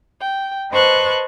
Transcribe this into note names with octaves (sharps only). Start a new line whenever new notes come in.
G5
B4 C5 D#5 A5 C#6 F#6